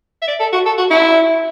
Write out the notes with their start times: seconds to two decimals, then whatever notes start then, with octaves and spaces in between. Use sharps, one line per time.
0.22 E5
0.28 D5
0.40 A4
0.53 F#4
0.65 A4
0.78 F#4
0.91 E4